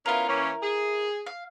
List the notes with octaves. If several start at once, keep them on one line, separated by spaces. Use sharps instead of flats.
B3 C#4 E4 F4 A#4
E3 A#3 C#4
G#4
F5